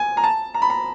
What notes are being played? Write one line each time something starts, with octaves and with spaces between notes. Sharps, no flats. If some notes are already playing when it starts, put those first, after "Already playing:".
Already playing: G#5
A#5
A5
A#5
B5
A#5